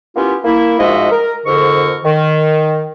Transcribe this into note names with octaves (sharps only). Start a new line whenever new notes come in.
A#3 B3 C#4 E4 F4 G4
A#3 E4
G#2 F3 G#3 F#4 D#5 E5
A#4
F2 G#2 D3 A#4 C#6
D#3